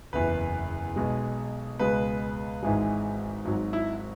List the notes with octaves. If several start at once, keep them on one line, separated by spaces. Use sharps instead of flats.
F#1 E2 E3 B4
B1 B2 G#3
C#2 B2 G#3 B4
G#1 G#2 E3 G#3
G#1 G#2 F#3
E4